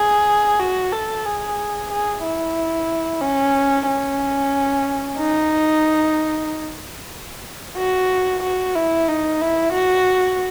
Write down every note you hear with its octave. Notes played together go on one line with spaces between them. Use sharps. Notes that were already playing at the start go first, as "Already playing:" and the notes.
Already playing: G#4
F#4
A4
G#4
G#4
E4
C#4
C#4
D#4
F#4
F#4
E4
D#4
E4
F#4